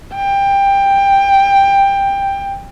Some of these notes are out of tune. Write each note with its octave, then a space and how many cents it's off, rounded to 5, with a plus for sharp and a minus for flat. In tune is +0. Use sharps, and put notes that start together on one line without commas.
G5 +15